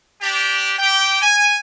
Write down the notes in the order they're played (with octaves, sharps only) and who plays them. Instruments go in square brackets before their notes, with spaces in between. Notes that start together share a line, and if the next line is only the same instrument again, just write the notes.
[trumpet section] D4 G4
G4 G5
G#5